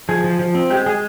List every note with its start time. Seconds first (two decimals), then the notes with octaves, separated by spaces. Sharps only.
0.09 F3 G#4
0.24 F3
0.39 F3
0.55 C4
0.70 G#3 G4
0.86 G#3 G#4